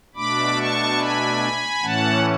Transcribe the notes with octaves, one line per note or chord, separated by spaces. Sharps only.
B2 A3 D4 B5 D6
A5 C#6
G#5 B5
A2 E3 A3 C#4 F#5 A5